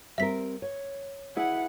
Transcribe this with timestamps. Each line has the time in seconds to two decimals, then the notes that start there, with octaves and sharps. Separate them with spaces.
0.18 G3 C4 A#4 E5 B6
0.62 C#5
1.37 E4 G#4 B4 F#5